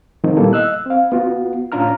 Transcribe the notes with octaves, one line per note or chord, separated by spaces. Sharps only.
D#3 F3 G#3 C4 D#4
A#2 G3 A#3 B3 E4 A4
D#5 E6 F#6
C4 F5
B3 F4 F#4
A2 C#4 D4 F4 A#5 F6